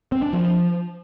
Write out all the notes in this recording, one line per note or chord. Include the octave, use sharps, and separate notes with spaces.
C4
D4
F3